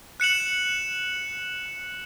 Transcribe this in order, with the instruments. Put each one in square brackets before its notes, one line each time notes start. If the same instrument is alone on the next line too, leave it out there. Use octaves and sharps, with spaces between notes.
[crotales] F#6 C#7 E7 F#7